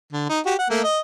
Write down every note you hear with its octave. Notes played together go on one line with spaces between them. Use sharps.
D3
D#4
F#4 G4
F#5
A3 A#3
D#5